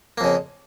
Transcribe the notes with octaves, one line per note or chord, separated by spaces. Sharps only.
F2 C#3 A#3